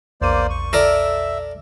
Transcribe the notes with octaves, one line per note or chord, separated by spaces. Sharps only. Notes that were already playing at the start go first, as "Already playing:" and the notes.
A#1 E2 A#3 C5 D5 D#7
C#6
A4 A#4 D5 E5